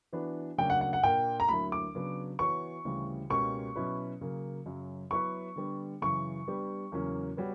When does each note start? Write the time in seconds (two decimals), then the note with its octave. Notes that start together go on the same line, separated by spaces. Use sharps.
0.13 E3 B3 D4 F#4 B4
0.58 D2 C#3 F#3 A#3 D4 G5
0.70 F#5
0.81 F#5
0.93 F#5
1.03 A#2 A#3 D4 A#4 G5
1.40 A#5
1.49 D2 D3 F#3 A#3 E4 B5
1.72 D6
1.95 C#3 F#3 B3 D4
2.39 E3 B3 F#4 C#5 C#6
2.85 D2 C#3 E3 G3
3.30 C#2 B2 A#3 C#4 G4 C#6
3.76 B2 F#3 C#4 E4 B4
4.21 C#3 F#3 A#3
4.66 F#2 C#3 F#3
5.11 F#3 B3 E4 B4 E5 C#6
5.56 D3 G3 B3
6.02 F#2 C#3 E3 C#6
6.48 G3 B3 D4 G4
6.92 E2 C#3 F#3 A#3 C#4
7.37 G3 B3 F#4 C#5